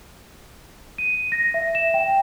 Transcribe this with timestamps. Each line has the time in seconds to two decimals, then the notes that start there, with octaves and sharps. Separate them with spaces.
0.98 D#7
1.32 A#6
1.54 E5
1.75 E7
1.94 G5